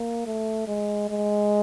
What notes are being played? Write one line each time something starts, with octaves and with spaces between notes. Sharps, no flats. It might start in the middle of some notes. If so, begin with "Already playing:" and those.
Already playing: A#3
A3
G#3
G#3